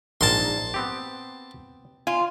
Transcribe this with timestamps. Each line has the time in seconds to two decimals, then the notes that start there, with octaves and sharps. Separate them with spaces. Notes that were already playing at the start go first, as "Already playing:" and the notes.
0.21 A#1 G#2 A#4 A5 C6
0.74 B3 C4 G4
2.07 F4 G#5